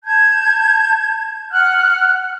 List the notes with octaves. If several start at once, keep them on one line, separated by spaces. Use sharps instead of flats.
A5 G6 G#6
F#5 F6 F#6